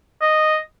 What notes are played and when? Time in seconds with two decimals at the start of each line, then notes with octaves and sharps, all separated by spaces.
0.21 D#5